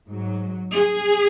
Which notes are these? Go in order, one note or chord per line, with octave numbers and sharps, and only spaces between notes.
G#2 F#3
G#4